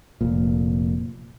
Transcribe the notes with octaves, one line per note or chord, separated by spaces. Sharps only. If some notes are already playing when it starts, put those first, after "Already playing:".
F1 A#2